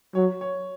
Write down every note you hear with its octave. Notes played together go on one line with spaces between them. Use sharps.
F#3 C#5
C#5